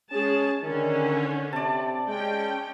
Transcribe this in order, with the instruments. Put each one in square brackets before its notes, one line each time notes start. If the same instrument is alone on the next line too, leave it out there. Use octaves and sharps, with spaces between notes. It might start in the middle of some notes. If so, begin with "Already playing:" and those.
[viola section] G#3 G#4 A5 [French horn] C#4
[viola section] D3 C#4 [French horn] D#3
[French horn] C3 [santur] D5 A5
[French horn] G#3 [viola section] C#4 G5